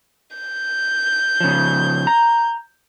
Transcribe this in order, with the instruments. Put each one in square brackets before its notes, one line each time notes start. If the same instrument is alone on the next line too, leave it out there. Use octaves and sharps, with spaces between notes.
[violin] G6
[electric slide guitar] C#3 F3
A#5